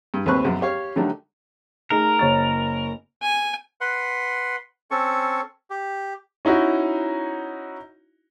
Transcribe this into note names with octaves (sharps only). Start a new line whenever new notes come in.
G2
D#2 A3 C4 B4 C#6 F#6
B1 F#2
G4 C#5 F5
D3 D#3 F#3 G3 A3 D4
A3 D#4 G#4 A#4
F#1 C#5 A6
G#5
B4 F#5 C6
C4 C#4 A4 C#6
G4
C#4 D#4 E4 F#4